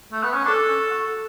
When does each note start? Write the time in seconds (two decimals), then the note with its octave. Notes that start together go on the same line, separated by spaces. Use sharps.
0.12 A3
0.23 B3
0.33 C#4
0.45 D4 A4
0.68 C#4
0.90 F#4